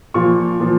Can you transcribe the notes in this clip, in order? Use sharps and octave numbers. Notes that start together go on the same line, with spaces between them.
A#2 F3 C#6
A#2 F3